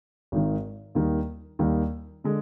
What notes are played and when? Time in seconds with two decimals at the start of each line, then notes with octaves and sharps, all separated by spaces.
0.32 G#1 G#2 D#3
0.95 D#2 D#3 G3
1.59 D#2 D#3 G3
2.24 D3 G#3